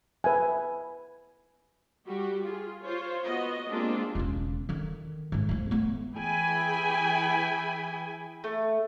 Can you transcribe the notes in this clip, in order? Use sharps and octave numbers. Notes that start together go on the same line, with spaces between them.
B4 E5 G#5
G3 F#4 G4
F4 G#4
F4 C5 C#5
B3 F#4 D#5
G#3 A#3 C4 D4 F4 G4
E1 C#3
D3 D#3
G#2 E3
D2 F3
A3 B3
E3 G#4 G5 G#5 B5
A3